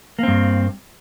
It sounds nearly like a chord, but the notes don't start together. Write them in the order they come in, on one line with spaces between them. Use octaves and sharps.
A#3 C4 G2